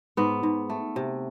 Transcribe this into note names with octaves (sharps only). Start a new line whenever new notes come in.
G#2 B3
G#2
A3
C3